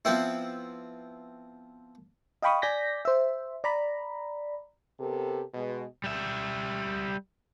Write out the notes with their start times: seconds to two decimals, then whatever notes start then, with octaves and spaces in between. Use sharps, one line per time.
0.05 F3 B3 C4 E4
2.42 D#5 F5 G5 B5 C#6 D#6
2.62 D5 G#5 G6 A#6 B6
3.05 C5 E5
3.64 D5 A#5 B5
5.00 C3 B3 G4 A4 A#4
5.54 B2 G#3
6.04 G3 E5